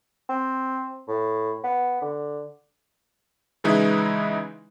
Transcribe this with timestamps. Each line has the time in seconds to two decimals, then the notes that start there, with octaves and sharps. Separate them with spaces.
0.29 C4
1.08 A2
1.64 B3
2.01 D3
3.64 C#3 E3 G#3 D#4 E4 B4